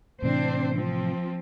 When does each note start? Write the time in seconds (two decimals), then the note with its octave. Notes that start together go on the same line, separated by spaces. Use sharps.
0.22 A2 C3 E3 C4 D4 C5
0.73 F3 C4